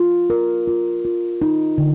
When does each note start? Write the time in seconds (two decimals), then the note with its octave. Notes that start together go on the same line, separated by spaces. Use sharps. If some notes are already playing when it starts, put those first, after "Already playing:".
Already playing: F4
0.30 A#4
0.68 F4
1.05 F4
1.42 D#4
1.78 D3